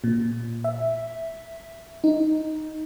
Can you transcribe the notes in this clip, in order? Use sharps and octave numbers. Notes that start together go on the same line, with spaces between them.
A#2
E5
D#4